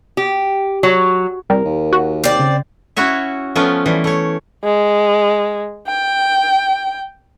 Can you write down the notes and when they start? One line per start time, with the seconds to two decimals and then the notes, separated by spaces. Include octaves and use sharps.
0.17 G4
0.83 F#3
1.50 C2 G3 A#4
1.65 D#2
1.93 F#4
2.24 C4 D5
2.40 C#3
2.97 C#4 E4 F#4 C#5 E5
3.55 F3 A3 B3 C#4 F4
3.86 E3 G3
4.04 A3 C#5
4.64 G#3
5.87 G5